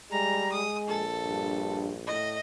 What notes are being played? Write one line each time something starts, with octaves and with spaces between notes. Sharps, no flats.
G3 G#3 A#5
G#3 D#6
A#1 A4
G2
A2 D#5